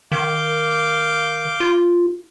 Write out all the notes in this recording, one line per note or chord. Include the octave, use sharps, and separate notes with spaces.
D#3 F5 D6 G6
F4